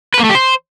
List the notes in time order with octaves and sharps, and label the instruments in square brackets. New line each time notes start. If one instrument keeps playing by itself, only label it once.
[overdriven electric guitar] B4
A#3
A3
G4
C5